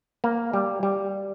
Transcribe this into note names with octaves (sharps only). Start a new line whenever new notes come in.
A#3
G3
G3